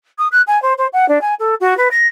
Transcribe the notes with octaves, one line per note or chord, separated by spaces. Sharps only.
D#6
F#6
G#5
C5
C5
F#5
D4
G#5
A4
F#4
B4
A#6